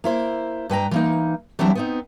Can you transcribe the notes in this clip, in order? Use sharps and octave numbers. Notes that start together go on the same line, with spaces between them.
A#3 E4 C5
G2 B4 G5 A#5
E3 A#3 D#4
E3 F#3 G3 C4 D4 E4
B3 C4 D#4